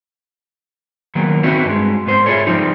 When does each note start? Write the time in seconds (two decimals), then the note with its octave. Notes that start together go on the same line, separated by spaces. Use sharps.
1.15 D#3 F#3 A#3 B3
1.43 B3 C4 D#4 E4 F#4 B4
1.65 G2 G#3
2.06 G#2 B3 C5
2.26 E4 F4 G#4 A4 C#5
2.47 F3 G3 C4 D#4 F4